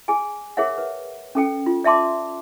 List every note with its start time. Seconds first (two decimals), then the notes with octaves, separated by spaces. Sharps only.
0.08 G#4 G#5
0.57 G#4 A#4 C#5 E5 F#5
0.78 B4
1.35 C#4 A4 G5
1.66 F4
1.84 D5 E5 A5 C6 D6